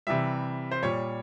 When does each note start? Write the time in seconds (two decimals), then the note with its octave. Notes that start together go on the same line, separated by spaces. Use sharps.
0.07 C3 E3 G3 E5
0.71 C5
0.83 A#2 G3 C#5